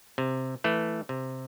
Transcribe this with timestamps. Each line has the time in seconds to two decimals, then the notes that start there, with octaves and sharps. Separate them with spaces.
0.18 C3
0.64 E3 A3
1.09 C3